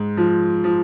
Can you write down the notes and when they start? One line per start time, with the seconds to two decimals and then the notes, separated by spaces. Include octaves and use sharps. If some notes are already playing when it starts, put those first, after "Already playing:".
Already playing: G#2
0.17 F3
0.64 F3